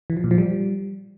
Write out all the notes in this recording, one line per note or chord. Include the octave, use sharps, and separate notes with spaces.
E3
F3
A#2
F3
G3